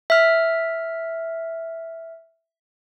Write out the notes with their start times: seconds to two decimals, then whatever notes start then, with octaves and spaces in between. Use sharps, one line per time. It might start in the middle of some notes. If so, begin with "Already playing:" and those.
0.10 E5 F6